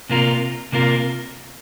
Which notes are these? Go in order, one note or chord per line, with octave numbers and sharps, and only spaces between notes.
C3 A#3 F4 A#4
C3 A#3 F4 A#4